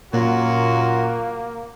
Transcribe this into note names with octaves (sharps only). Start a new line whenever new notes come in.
F#2 A#2 A#3 F4 F#4